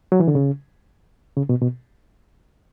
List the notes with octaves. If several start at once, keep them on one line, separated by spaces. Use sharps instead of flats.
F#3
E3
D3
C#3
C#3
B2
B2